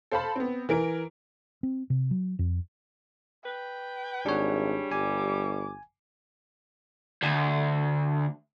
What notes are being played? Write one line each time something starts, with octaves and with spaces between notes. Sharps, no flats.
A4 C5 F5 A5 B5
B3 C4
E3 A#4 D7
C4
C3
F#3
F2
B4 G5
G#1 G3 D4 G#4 C#5
G1 G#5 D6
D2